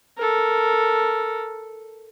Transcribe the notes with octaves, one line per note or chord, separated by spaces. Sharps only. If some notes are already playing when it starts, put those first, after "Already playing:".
A4 A#4